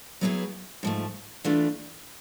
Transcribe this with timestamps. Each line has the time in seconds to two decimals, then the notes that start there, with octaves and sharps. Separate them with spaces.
0.21 F#3 B3 E4 G#4 B4
0.83 G#2 F3 A3
1.45 E3 A3 D4 F4